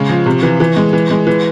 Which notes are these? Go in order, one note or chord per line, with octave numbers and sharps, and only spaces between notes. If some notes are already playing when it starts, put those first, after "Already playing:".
Already playing: C#3 G#3
F3
C3
E3
E3
G#3
E3
G#3
E3